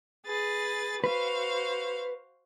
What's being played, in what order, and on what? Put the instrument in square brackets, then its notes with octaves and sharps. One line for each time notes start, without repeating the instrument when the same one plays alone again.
[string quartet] G#4 B4 A6
[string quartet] F#4 C5 F5 [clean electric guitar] B4